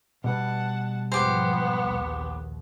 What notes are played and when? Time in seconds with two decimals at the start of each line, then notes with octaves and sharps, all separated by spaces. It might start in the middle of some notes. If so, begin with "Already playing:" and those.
0.24 B2 G3 B4 F#5 A5
1.12 E2 G#2 F3 B3 G4 C5
1.81 A#1 D#2